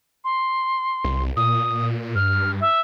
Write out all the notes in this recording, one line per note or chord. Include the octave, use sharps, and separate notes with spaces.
C6
C2
A#2 D#6
G2 F6
E5